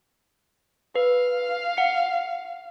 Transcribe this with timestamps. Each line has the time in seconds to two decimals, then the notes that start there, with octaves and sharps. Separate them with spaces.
0.96 B4 F5
1.77 F#5 C#7